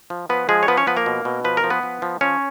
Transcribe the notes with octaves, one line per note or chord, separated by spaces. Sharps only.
F3
F3 B3 B4
F3 G#3 G#4
C#5
F3 B3 B4
C#4 C#5
F3 B3 B4
A#3 A#4
B2
B2
F3 B4
A#4
F3
B3 B4
F3
F3
F3 C#4 C#5